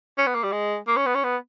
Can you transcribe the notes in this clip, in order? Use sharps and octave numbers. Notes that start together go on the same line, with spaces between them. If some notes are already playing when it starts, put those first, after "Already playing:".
C#4
B3
A#3
G3
G#3
A#3
C#4
B3
C#4
B3